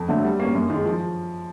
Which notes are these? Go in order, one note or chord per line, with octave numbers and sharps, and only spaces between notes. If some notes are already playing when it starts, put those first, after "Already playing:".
Already playing: F2
D3 F#3 A3
G3
A#3 C#4
F#2
D#3 G#3
F3